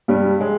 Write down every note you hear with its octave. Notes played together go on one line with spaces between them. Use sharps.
G2 G3
G#3